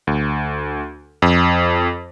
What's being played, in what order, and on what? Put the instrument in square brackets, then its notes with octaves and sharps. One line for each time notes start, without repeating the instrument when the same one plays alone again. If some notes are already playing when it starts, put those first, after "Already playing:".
[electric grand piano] D2
F2